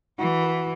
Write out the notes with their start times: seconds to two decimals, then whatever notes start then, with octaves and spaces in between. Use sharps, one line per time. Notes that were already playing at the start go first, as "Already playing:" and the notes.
0.19 E3 F#4
0.43 B4